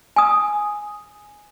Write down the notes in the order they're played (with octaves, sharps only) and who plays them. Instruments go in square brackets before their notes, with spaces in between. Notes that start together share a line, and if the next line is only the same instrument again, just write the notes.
[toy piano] G#5 D#6